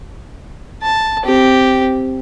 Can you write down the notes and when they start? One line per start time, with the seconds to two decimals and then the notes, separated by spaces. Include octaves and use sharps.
0.82 A5
1.25 C4 G4